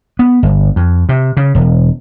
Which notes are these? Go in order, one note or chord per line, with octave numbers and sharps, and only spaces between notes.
B3
G1
F2
C3
C#3
E1